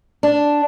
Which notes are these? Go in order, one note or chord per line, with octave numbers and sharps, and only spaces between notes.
D4